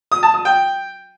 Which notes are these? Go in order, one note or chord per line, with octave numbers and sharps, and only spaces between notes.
D#6
A5
D#6
G5